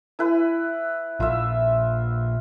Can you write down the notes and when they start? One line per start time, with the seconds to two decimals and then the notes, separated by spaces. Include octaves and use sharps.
0.19 E4 B4
1.20 A#1 F4 E5